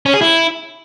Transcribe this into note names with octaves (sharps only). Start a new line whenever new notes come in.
C#4
G#4
E4